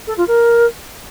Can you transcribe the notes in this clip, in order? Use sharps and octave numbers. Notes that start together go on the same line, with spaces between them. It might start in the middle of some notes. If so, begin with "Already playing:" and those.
A4
F4
A#4